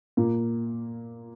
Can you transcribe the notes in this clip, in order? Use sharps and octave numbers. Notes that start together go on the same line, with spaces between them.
A#2 A#3